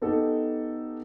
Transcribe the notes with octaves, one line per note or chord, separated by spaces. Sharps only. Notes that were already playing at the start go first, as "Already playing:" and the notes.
B3 D#4 G4 A4